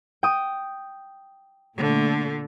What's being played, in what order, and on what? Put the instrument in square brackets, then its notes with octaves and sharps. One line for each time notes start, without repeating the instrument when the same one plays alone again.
[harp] G5 D#6
[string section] A#2 A3 [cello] D3